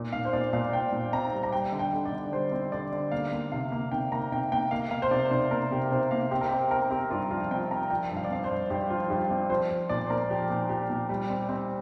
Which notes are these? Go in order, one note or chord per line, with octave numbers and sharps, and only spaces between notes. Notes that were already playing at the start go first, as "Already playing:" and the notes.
Already playing: A#2
A#2 F5
C5
A#2 D5
A#2 F5
A#2 G5
A#2
C4 A#5
G3
A#5
G3 G5
D3
G5
D3
D5
D3
G3 C5
C4
D3 D5
D3
A#3 F5
A#3
C3 F5
A#3
C3 G5
A#3 A#5
C3 G5
A#3 G5
A#3 F5
A#3 F5
C5
C3 D5
C3 C5
A#3 A#4
C3 G4
C3 C5
A#3 F5
C4 G4
A#4
C4 G4
C4 A#4
C4 G4
G2 F4
F3 F4
C4 G5
C4 A#5
F3 G5
G2
F5
D5
C4 F5
C5
G2
G2 G4
F3 F4
G2 G4
C4
F3 C5
F3
A#2 D5
C5
A#2 A#4
F3 G4
A#2
F3 G4
A#2
G3
C4
C4